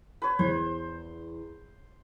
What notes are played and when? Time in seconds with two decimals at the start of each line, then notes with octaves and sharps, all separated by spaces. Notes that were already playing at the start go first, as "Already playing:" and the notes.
0.22 B4 C#5
0.39 E2 C5